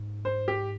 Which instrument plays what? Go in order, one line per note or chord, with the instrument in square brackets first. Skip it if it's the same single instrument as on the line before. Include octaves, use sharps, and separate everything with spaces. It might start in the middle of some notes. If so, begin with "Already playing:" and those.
Already playing: [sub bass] G#2
[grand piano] C5
G4